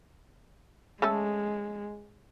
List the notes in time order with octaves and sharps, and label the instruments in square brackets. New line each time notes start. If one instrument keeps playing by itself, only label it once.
[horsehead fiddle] G#3 [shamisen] A3 C#4 A4